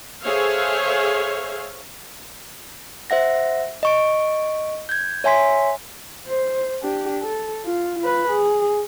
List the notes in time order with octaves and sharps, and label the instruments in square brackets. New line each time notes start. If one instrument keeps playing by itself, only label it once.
[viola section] G#4 A4 C5 C#5 E5 F5
[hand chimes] C5 E5 F#5 A#6
D#5 C#6 D7
G6 G#6
C#5 E5 G#5 C6 B6
[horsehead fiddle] C5
D4 G4
A4
F4
F4 B4
G#4